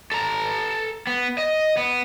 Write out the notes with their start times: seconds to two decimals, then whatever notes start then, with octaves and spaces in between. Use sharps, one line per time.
0.12 A4 A#5
1.07 B3
1.38 D#5
1.77 B3